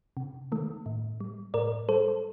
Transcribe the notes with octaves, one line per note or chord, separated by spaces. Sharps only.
C3
D#3 A3
A2
G3
A2 A#4 D5
G3 A4 C5